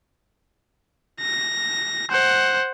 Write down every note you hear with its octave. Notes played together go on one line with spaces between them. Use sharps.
A#6
C5 F#5